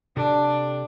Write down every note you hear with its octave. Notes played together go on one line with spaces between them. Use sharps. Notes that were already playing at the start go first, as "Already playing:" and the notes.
C3 D4 G4 A4